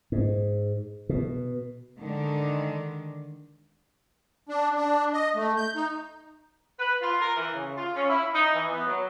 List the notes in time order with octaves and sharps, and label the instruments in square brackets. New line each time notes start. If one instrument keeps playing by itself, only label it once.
[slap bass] G#2
B2
[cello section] D3 D#3 G#3 D4
[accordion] D4
D4
D#5
A3
G6
D#4
[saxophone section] B4
F4
A#4
E3
C#3
F4
C#4
E4
D#4
E3
B3
F#3